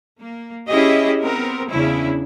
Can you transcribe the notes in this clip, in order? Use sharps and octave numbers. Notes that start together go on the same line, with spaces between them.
A#3
C#4 E4 G4 G#4 D#5
B3 C4 A#4
E2 C#3 C#4 D4 E4